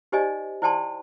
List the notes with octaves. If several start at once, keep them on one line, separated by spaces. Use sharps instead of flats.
D#4 G4 C5 D5 D#5 G#5
E4 C5 D5 G5 A5 C6